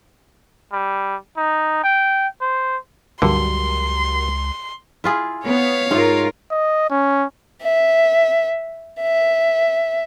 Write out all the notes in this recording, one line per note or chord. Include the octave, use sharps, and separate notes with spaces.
G3
D#4
G5
C5
C#2 G2 D3 F#3 G3 A#4 C6
E4 F4 G#4
B3 C#5 F5
G#2 F4 A#4
D#5
C#4
E5
E5